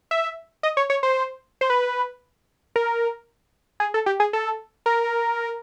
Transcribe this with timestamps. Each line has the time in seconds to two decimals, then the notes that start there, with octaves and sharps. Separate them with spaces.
0.11 E5
0.63 D#5
0.77 C#5
0.90 C#5
1.03 C5
1.61 C5
1.70 B4
2.76 A#4
3.80 G#4
3.94 A4
4.06 G4
4.20 G#4
4.33 A4
4.86 A#4